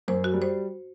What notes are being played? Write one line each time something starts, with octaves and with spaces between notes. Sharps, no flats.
F#2 C5
F#4
G3
C5